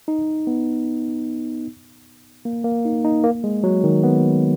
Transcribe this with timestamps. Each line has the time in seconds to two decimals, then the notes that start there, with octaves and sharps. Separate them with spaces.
0.08 D#4
0.47 B3
2.45 A#3
2.64 A#3
2.85 D#4
3.04 D#4
3.23 A#3
3.44 G#3
3.64 F#3
3.84 D#3
4.03 B3